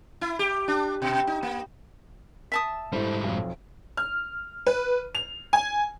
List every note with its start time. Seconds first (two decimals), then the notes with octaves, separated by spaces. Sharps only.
0.21 E4
0.39 G4
0.68 D4
1.02 B2
1.27 D#4
1.43 A#3
2.52 E5 A5 D#6
2.92 G#2 G3 E4 A4 C5
3.24 B1 F2
3.97 F6
4.66 B4
5.15 F7
5.53 G#5